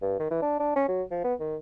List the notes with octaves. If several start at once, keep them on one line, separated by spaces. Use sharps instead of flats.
G2
D#3
E3
D4
D4
C#4
F#3
F3
B3
D#3